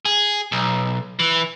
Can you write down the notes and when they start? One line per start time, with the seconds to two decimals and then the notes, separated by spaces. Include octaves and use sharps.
0.05 G#4
0.52 B1
1.19 E3